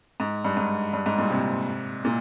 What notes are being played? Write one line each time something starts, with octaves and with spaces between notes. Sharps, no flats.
G#2
G2
G#2
G2
G#2
G2 A#2
G#2 C3
A#2